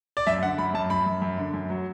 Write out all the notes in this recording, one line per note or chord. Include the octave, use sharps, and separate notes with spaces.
D5
F#2 E5
D3 F#5
F#2 B5
F#2 A5
F#2 B5
F#2
F#2
D3
F#2
F#3